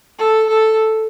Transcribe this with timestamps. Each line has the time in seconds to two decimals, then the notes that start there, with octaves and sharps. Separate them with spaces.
0.18 A4
0.49 A4